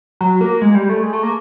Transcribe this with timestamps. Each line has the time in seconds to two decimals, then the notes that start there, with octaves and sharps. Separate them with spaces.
0.21 F#3
0.41 A#3
0.61 G#3
0.75 G3
0.89 A3
1.03 G#3
1.13 A3
1.23 A#3